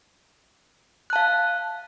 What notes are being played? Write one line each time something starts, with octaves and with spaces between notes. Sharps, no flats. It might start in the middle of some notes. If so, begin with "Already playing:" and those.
F5 A5 F#6